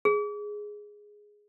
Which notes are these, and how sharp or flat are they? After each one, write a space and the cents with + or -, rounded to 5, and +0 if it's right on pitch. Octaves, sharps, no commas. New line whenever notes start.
G#4 +0